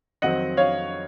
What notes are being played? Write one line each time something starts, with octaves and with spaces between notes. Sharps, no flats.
F2 D#3 F#3 C4 D#5 F#5
C#5 F5